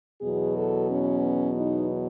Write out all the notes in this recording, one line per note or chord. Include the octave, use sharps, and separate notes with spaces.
E2 B2 F#3 G#4
A4
C#4
D#4